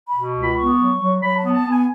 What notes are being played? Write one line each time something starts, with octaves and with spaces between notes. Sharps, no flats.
B5
B2
C#2
B5
B3 C#6
F#3
F#3
F#3 B5
A5
B3
A5
B3
G#5